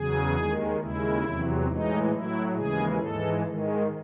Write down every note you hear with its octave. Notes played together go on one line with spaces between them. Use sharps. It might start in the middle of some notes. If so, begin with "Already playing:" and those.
Already playing: E2 C#3 F#3 G#4
D#2 D#3 G#3
D#2 C#3 G#3 E4
E2 C3 F#3
A2 E3 G#3 D#4
A2 F#3 E4
D#2 C#3 E3 G#3 G#4
G#2 E3 G#3 A4
G#2 D#3 G#3